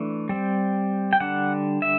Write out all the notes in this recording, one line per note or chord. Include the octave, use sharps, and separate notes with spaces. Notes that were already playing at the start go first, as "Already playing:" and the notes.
Already playing: E3 A3 D4
G3 C4
G5
D3 G3 D4 F#5
E5